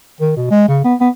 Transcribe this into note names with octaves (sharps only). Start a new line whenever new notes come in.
D#3
B2
G#3
C#3
B3
B3